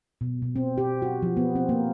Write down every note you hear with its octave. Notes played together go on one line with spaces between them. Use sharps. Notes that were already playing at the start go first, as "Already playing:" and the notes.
B2
B2
C4
G4
F#4
F3
B3
C4
A#3